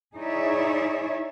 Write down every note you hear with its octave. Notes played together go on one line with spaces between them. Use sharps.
D#4 E4 G#4 C#5 D5 E5